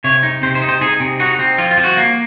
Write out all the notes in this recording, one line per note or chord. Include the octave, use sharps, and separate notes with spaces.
C3 C#5
D#4
C3 C5
C5
D#4
C5
D#4 G#4
C3
D#4 F#4
C4
F3 F4
F4
F3
F#4
A#3